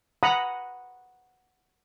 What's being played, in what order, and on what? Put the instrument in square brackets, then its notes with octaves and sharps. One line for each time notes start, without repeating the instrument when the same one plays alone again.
[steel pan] F#5 A#5 B5 D#6